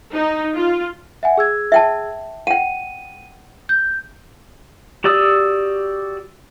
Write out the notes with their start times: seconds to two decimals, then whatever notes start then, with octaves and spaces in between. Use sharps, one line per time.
0.15 D#4
0.56 F4
1.23 E5 F#5 G#5
1.37 G#4 E6 G#6
1.72 E5 G5 A5
2.47 F#5 G5 D#7
3.69 G6
5.04 F#4 G4 D5 D#6 E6